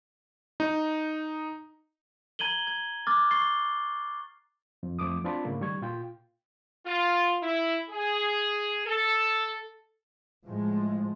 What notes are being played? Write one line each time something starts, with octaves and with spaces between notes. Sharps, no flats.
D#4
A#5 G#6 D#7 F#7 G7
G#6
D6 F6 F#6 A6
C#6 G#6 A6 C7 G7
F2
F2 A3 D6 D#6
C4 D4 F4 D5 A5 B5
G#2 C#3 A3 A#3
D#3 G3 C#6 G#6
A#2 F4 G5
F4
E4
G#4
A4
A2 F3 G#3